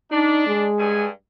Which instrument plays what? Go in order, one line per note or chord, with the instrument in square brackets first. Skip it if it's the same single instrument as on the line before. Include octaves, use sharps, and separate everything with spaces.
[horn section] D4 [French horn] D#4
[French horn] G#3
[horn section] G2 G#5